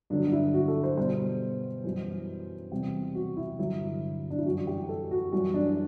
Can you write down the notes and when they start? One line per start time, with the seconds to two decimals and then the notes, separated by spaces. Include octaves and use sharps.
0.10 G2 D3 F#3 D4
0.27 D4
0.32 E4
0.54 F#4
0.68 A4
0.84 C5
0.97 B2 G3 C5
1.84 F#2 E3 G3
2.71 E2 C3 G3 G4
3.15 F#4
3.37 E4
3.59 G2 D3 F#3 E4
4.30 D4
4.38 E4
4.46 F#2 E3 G3 F#4
4.67 G4
4.89 A4
5.11 F#4
5.32 F#2 E3 G3 F#4
5.54 D4